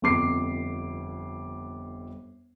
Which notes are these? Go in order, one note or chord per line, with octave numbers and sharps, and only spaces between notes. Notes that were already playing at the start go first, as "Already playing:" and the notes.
G1 F2 D6 C7